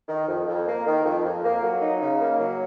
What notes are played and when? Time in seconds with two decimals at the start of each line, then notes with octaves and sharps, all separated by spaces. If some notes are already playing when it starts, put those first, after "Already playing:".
0.08 D#3
0.27 F2
0.47 F2
0.66 A#3
0.86 D#3
1.05 F2
1.24 F2
1.43 A#3
1.62 F#3
1.81 D#4
2.01 C#3
2.20 A#3
2.39 F#3